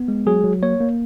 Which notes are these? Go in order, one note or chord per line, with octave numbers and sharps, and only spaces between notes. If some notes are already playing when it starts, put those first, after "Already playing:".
Already playing: B3
G#3
F#3 G#4
F#3
A#3 C#5
A#3